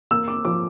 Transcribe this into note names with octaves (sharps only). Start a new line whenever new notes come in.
A#3 E6
D6
F3 D6